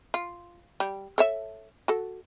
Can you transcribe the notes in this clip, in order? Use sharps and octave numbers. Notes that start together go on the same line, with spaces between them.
F4
G3
A4 C#5 E5
F#4 A4